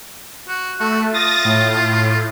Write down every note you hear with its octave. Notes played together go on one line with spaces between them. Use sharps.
F#4
A3 F#4
F4 D#6 A6 A#6
A2